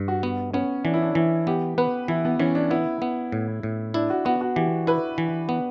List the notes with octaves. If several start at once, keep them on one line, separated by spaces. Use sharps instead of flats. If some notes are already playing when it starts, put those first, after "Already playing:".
Already playing: G2
F#4
B3
B3 C#4
E3 D4
E4
D4
E3 E4
B3 G4
B3 B4
E3 E4
B3
E3 C#4
D4
B3 E4
B3
A2
A2
D4 E4
F#4
B3 F#4
F#4
E3 G4
E4 B4
E3
B3